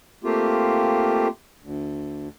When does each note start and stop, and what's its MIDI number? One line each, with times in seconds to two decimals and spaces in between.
0.24 1.28 57
0.24 1.28 58
0.24 1.28 60
0.24 1.28 65
0.24 1.28 67
1.62 2.28 38